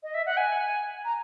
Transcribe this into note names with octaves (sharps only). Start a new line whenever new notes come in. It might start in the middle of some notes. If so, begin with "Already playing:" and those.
D#5
E5
F#5
G#5
A#5